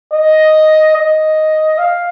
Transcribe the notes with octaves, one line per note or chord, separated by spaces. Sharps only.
D#5
D#5
F5